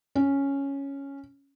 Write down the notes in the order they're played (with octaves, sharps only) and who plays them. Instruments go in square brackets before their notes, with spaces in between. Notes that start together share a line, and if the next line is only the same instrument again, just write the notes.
[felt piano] C#4